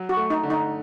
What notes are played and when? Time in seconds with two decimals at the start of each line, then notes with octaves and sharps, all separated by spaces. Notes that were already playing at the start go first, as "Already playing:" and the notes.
Already playing: F#3
0.09 F#4
0.17 A3
0.30 D#4
0.43 D3
0.50 D#4